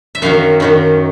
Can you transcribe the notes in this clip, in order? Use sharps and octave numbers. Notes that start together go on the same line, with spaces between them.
E5
F#2 D#3 F#3 F5
F#2 D#3 F#3